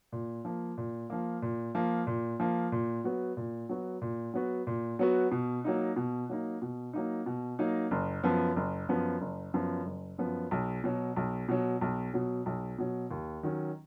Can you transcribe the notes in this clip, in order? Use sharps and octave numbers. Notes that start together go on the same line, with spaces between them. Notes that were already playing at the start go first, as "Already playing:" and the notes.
A#2
F3 A#3
A#2
F3 A#3
A#2
F3 A#3
A#2
F3 A#3
A#2
F#3 B3 F#4
A#2
F#3 B3 F#4
A#2
F#3 B3 F#4
A#2
F#3 B3 F#4
B2
F#3 A#3 D#4
B2
F#3 A#3 D#4
B2
F#3 A#3 D#4
B2
F#3 A#3 D#4
F#1
F#2 F3 B3
F#1
F#2 F3 B3
F#1
F#2 F3 B3
F#1
F#2 F3 B3
B1
B2 F#3
B1
B2 F#3
B1
B2 F#3
B1
B2 F#3
D#2
D#3 F#3 C#4